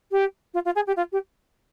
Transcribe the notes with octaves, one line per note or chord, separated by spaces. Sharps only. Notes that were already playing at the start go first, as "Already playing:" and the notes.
G4
F4
F4
G#4
G4
F4
G4